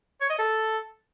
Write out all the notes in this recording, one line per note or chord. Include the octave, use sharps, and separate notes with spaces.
C#5
D#5
A4